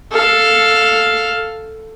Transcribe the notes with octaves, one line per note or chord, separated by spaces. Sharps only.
A4 F5